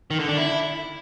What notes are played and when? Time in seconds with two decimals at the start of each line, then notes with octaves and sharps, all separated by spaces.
0.11 D#3
0.19 D3
0.28 D4
0.37 E4